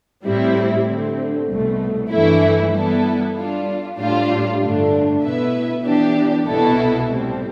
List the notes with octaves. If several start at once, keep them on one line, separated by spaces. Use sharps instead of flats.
A2 G3 C4 E4
D3 A3 C4
C2 B2 A3
G2 E3 A3 E4
G3 B3 E4 A4
G3 D4 F4
A2 G3 D4 F4
G2 D3 A3 D4
B2 B3 E4 B4 E5
E3 B3 D4 G4
C2 B2 B3 E4 A4
A2 G3 C4